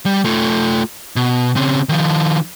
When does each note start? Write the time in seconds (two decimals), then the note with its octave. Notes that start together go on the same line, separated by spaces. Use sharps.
0.06 G3
0.24 A3 F4
1.16 B2
1.56 C#3 C4
1.89 D#3 F3